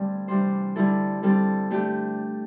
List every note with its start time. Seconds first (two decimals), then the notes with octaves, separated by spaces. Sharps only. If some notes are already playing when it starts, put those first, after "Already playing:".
Already playing: G2 D3 G3 A3 C4 D4 G4 C5
0.28 C3 E3 G3 D4 C5
0.76 D3 G3 E4 A4
1.23 D3 G3 C4 A4
1.70 D3 A3 D4 G4